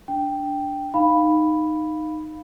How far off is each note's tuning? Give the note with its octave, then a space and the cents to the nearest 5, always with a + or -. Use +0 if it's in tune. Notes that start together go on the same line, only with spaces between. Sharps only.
D4 -10 G5 +0
D#4 -10 F5 +0 B5 +0